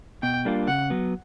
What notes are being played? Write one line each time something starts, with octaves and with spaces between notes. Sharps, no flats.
B2 G5
G3 A#3 D4 F4
C#3 F#5
F#3 B3